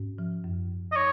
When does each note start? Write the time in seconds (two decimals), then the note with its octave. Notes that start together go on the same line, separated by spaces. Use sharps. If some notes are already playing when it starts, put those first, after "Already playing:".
Already playing: G#2 C#4
0.18 F3
0.44 F#2
0.70 F#2
0.92 D#5
0.96 D#4 C#5